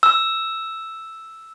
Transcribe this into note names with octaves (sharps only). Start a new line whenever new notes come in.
E6